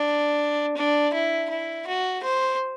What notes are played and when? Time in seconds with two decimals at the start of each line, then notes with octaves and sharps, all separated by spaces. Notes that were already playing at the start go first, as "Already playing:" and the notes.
Already playing: D4
0.77 D4
1.14 E4
1.50 E4
1.87 F#4
2.24 C5